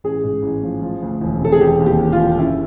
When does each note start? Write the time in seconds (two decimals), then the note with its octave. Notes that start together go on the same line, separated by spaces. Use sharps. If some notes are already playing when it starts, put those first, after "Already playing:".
0.04 A1 G#4
0.24 G#2
0.43 A1
0.63 F3
0.82 F3
1.02 D2
1.21 E1
1.41 C3 A4
1.52 G#4
1.61 E1 G4
1.81 D#2
1.86 G4
2.00 E1
2.12 F4
2.19 D3
2.38 F#2 E4